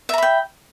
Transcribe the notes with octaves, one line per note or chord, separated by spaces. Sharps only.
E5 G5 A#5 B5